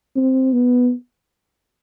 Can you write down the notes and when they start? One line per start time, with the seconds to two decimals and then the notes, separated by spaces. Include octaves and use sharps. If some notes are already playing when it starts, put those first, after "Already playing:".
0.16 C4
0.53 B3